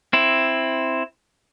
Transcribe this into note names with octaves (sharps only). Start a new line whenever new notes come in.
C4 E4